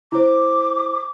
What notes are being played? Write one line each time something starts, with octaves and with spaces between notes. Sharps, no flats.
E4 C5 D6